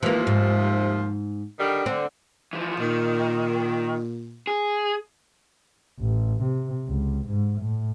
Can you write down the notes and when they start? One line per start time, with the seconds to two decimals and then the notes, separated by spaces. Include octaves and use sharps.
0.03 D#2 C3 E3 F3 A#3
0.27 G#2
1.59 D3 D#3 G3
1.86 D3 C4
2.53 E3 F3
2.80 A#2 D#3
4.47 G#4
6.00 A1
6.43 C3
6.88 C#2
7.28 G#2
7.61 A2